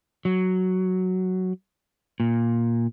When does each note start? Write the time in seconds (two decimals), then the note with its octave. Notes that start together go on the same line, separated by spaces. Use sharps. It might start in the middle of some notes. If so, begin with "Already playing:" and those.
0.25 F#3
2.20 A#2